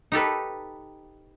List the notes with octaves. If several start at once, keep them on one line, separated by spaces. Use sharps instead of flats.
D#4 G4 A4 B4